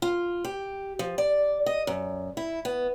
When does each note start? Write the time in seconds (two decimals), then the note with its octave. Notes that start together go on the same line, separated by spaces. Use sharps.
0.02 F4
0.45 G4
0.99 F3
1.18 D5
1.66 D#5
1.87 F#2
2.37 E4
2.65 B3